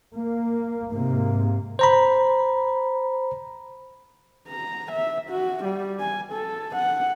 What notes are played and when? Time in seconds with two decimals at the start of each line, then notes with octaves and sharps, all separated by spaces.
0.15 A#3
0.92 G#2 C3 A#3
1.79 C5 A#5 B5
4.48 A#5
4.92 E5
5.30 F#4
5.64 G3
6.00 G#5
6.33 A4
6.76 F#5